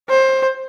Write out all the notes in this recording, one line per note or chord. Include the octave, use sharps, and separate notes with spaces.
C5